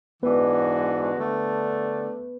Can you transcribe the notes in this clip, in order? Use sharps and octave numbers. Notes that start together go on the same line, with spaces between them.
G#2 E3 G#3 B3 D4 F#4 B4
D3 A3 D4